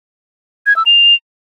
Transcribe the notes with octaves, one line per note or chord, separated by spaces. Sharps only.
G#6
E6
F7